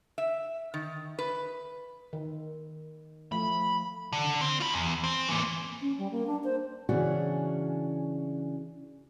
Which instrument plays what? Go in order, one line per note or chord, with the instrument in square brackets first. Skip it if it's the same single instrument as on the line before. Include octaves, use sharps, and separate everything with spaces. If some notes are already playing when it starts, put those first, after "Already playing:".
[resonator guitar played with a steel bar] E5
D#3
B4
[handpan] D#3
[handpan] F3 A3 [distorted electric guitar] B5
[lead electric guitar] D3
C4
F4 B5
E2
C4
E3 A#3
[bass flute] C#4
G3
A#3
D4
C5
[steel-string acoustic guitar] C#3 E3 C#4 D4 F#4 G#4